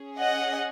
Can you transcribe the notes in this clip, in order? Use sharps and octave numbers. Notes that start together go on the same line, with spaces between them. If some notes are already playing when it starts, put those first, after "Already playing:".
Already playing: C#4 G#4
D#5 F#5